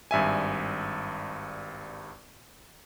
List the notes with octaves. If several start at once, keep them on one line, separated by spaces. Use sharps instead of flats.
G#1 G2 E5 G#5